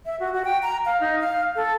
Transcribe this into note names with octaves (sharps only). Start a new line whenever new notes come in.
E5
F#4
F#4
G5
A#5
F5
D#4
F5
A4